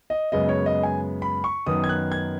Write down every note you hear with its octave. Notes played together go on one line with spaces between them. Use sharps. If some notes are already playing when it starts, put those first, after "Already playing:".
D#5
F#2 C#3 G#3 B3 D#5
C#5
D#5
G#5
B5
C#6
F#2 D#3 B3 D#6
G#6
F#6
G#6